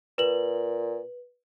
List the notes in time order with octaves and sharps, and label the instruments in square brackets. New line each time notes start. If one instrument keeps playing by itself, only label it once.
[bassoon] A#2 [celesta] B4 F#7